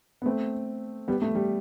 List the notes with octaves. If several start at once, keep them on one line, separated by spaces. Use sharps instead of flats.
B3
A3 C4
G3 B3
A3
G3